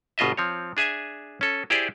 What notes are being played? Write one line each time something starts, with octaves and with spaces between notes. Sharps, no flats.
G1 B2 F4 D#5 E5
F3 C4 C#5
D4 G#4 E5 G#5
C#4 A4
E4 G4 G#4 C5 D5